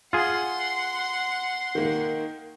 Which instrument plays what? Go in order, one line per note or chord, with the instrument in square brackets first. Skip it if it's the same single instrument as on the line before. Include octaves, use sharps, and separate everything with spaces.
[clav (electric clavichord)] F4 G#4 [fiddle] F#5 C6
[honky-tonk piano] D#3 A#3